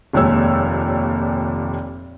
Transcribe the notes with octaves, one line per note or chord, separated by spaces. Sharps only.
F1 D#2 A#2 G#3 C#5 E6